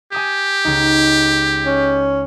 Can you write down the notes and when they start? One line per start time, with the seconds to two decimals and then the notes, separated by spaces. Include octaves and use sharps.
0.12 G4 G#5 D#6 E7
0.65 C#2 D#4
1.66 C#4